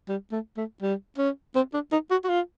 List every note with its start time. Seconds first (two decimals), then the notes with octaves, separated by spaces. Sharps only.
0.08 G3
0.32 A3
0.57 A3
0.82 G3
1.18 C#4
1.55 C4
1.74 D4
1.92 D#4
2.11 F#4
2.24 F#4
2.29 F4